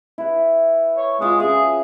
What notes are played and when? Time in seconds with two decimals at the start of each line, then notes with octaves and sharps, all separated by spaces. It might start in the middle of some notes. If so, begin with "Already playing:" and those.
0.18 E4 B4
0.97 C#5
1.20 G#3 F4 F#4
1.40 C#3 G#4 E5